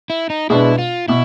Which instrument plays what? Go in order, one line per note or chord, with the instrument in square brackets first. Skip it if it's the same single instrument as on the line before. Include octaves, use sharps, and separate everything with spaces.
[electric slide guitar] E4
D#4
[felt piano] B2 G#3 B3 D4 [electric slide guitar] E4
[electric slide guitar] F4
[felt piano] B2 [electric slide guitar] E4